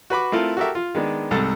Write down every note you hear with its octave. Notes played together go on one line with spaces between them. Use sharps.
F#4 B4 B5 D6
A3 C4 E4 F4 A4 A#4
F#4 G4 A4 A#4 E5
F4
D#3 G#3 B3 D4
C2 G#2 A4 A5 A#5